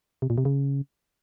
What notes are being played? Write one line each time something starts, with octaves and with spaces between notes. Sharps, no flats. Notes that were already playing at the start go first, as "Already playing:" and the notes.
C3
A#2
C3
C#3